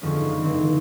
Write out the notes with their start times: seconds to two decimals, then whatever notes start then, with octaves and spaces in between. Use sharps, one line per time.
0.02 F2 D3 D#3 G#3 B3 C#4
0.20 F#1
0.41 F1 C#2 D#3 C4 D7
0.57 E3